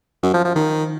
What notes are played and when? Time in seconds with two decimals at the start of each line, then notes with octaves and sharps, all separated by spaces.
0.23 F#2
0.34 F3
0.44 F3
0.55 D#3